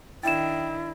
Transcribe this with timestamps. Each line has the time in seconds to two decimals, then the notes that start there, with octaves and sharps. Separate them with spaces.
0.23 D#3 D4 E4 G5 A6 E7